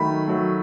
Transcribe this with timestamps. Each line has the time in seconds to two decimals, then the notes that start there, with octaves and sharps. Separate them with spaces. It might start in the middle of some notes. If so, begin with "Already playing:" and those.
Already playing: D#3 F#3 A3 B5
0.28 F#3 A3